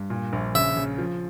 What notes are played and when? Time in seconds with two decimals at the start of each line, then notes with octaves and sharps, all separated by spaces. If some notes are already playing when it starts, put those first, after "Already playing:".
Already playing: G2
0.10 A#2
0.33 A#1
0.55 C#3 E5
0.77 C#3
0.98 F3